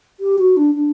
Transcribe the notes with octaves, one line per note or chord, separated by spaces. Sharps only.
G4
F#4
D4
D4